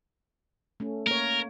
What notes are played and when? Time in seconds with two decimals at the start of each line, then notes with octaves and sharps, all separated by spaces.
0.80 A3 C#4
1.07 A#3 A#4 C#5